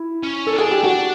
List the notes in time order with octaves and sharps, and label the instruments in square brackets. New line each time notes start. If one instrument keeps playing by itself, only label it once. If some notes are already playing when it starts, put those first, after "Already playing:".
Already playing: [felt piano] E4
[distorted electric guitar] C#4
[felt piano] A4
[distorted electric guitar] D4
[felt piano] G#4
G4
[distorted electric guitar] D4 [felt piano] F#4